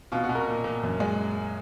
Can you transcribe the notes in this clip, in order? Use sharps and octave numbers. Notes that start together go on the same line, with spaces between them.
B2 F4
F#4
B2
A#4
A#2
A#2
F#2
G#3